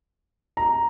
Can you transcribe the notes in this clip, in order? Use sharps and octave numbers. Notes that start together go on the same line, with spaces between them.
A#5